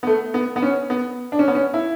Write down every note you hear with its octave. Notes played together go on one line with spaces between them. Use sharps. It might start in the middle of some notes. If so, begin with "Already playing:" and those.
B3
A3
B3
B3
C#4
B3
D4
C#4
B3
C#4
E4